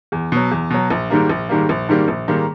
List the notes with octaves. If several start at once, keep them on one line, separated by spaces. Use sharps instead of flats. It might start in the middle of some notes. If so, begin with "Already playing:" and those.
E2
B2 F#3
E2
B2 F#3
A#1
G#2 D#3 G3 A#3
A#1
G#2 D#3 G3 A#3
A#1
G#2 D#3 G3 A#3
A#1
G#2 D#3 G3 A#3